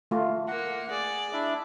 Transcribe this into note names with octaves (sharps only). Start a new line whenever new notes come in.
A3 F4
A#3 F#5
G#4 D5
D4 E4 E5